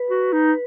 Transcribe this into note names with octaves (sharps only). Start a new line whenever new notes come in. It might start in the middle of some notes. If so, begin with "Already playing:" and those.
Already playing: B4
F#4
D#4